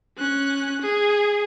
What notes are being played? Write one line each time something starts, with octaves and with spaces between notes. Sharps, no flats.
C#4 F#6
G#4